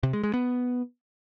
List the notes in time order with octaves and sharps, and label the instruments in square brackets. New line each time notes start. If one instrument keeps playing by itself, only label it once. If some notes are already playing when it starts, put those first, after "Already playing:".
[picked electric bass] C3
G#3
G#3
B3